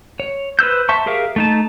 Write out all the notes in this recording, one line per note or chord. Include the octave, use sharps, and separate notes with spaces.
C#5
B4 C5 E6 G6
C5 E5 A5 C#6
G4 G#4 A#4 E5 F5
A3 D#4 A5